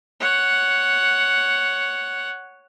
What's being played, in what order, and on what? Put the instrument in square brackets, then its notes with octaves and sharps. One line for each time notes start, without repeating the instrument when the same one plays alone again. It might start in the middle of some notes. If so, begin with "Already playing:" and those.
[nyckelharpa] C#5 F#5